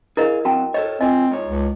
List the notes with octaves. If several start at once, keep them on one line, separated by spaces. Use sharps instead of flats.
E4 G#4 A#4 C5 D#5 F5
F#3 C4 F#4 G5 A5
A4 C5 C#5 D#5
C#2 C4 F4 D#5 G#5
G#2 F4 C#5
C#2